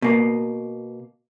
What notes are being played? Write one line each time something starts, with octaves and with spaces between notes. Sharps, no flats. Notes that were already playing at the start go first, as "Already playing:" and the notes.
B2 A#3